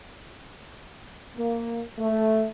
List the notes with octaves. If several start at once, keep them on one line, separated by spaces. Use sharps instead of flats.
A#3
A3